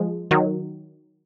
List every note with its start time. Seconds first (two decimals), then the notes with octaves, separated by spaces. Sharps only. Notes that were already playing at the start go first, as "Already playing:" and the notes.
Already playing: F3 G#3
0.31 D#3 F#3